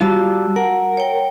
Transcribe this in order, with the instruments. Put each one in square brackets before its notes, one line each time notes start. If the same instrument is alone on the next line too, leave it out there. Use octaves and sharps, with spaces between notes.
[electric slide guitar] G3 F4 [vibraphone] F#4 A5 E6
[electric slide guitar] A#4 [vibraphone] F#5
[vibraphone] C#5 G5